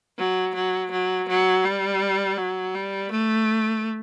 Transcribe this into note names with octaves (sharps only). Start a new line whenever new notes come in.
F#3
F#3
F#3
F#3
G3
F#3
G3
A3